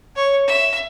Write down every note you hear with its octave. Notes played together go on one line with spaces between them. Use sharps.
C#5 C#6
E5